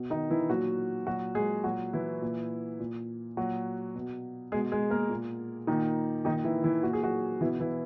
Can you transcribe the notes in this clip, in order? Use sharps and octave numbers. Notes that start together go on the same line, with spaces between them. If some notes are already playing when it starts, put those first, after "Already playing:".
Already playing: B2
D#3 D#4
E3 E4
A#2 F#3 F#4
A#2 F#3 F#4
G#3 G#4
A#2 F#3 F#4
E3 E4
A#2
A#2
A#2 F#3 F#4
B2
B2 G#3 G#4
G#3 G#4
A#3 A#4
A#2
A#2 D#3 D#4
A#2 D#3 D#4
E3 E4
E3 E4
A#2 F#4
G#4
F#3 F#4
B2 E3 E4
E3 E4